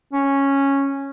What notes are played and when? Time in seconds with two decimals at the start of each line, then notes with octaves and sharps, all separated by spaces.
0.13 C#4